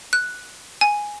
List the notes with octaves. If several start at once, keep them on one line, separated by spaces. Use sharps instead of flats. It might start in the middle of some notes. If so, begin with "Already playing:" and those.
F#6
G#5